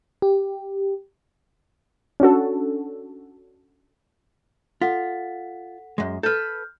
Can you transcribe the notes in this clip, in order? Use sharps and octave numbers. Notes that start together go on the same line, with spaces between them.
G4
C#4 D4 F#4 A4
F4 A4 F#5 B6
F#2 G#3
A4 B4 F6 G6